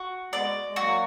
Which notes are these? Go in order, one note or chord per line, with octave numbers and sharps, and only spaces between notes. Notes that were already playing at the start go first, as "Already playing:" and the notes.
Already playing: F#4
G#3 B3 D5
G#3
F#3 A#3 F#4